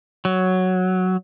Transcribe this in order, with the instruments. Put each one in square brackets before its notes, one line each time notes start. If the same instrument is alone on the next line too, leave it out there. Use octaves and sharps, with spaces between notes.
[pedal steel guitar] F#3